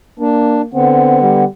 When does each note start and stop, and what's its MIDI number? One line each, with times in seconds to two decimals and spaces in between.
0.19 0.67 58
0.19 0.62 62
0.74 1.44 50
0.74 1.44 59
0.74 1.19 60
1.22 1.48 55